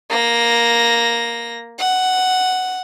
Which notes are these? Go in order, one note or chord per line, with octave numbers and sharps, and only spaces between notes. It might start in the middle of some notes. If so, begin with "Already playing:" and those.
A#3 A#6
F#5